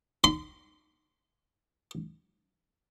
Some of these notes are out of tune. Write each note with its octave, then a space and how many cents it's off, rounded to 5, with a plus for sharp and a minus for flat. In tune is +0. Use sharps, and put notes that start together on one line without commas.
C6 -30